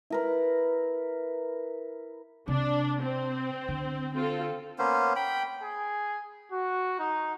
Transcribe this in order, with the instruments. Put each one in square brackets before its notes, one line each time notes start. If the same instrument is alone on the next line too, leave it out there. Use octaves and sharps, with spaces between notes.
[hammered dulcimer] E4 A#4 B4
[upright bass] C3 [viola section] D4
[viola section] C4
[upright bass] D3
[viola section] C4 F4 A4
[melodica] A#3 B3 C#4 C5
G5 B5
[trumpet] G#4
F#4
D#4